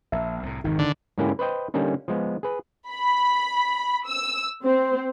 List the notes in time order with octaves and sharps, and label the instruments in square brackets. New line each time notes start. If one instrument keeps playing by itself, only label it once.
[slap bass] A#1 [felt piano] E5
[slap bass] C2 A2
[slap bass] G#1 F2 C3 [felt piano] D#3
[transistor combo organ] D3
[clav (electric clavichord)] G#2 D3 A#3 C#4 E4 G4
B4 C5 D#5 G5
D3 G3 A#3 C#4 D#4
F3 G#3 B3
G#4 B4
[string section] B5
E6
C4